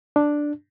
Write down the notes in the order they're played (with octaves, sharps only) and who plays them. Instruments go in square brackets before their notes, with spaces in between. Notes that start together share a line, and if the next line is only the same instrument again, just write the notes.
[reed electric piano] D4